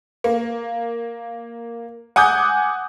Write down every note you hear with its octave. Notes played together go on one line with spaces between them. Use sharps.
A#3
F#5 G#5 D6 D#6 G6